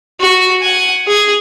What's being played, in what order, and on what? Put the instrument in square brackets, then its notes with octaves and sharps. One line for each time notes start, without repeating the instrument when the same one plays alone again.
[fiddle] F#4
F#5 G#5
G#4